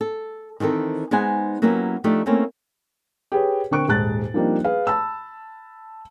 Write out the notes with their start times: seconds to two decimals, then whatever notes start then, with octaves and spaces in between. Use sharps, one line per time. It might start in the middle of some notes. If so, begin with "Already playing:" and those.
0.01 A4
0.60 D#3 E3 C4 A4 A#4
1.11 G#3 B3 D#4 C5 F#5 G#5
1.62 F#3 A#3 B3 C#4 E4 G4
2.04 F3 A3 D4 D#4 G4
2.26 A3 A#3 C4 C#4 E4
3.32 G4 G#4 B4 C#5
3.71 D3 C4 A#4 C#6 F#6 D7
3.88 D#1 G#2 A5 F#6 A6
4.34 F3 G3 A#3 C4 D4 D#4
4.64 G#4 B4 F5
4.87 A5 B5 E6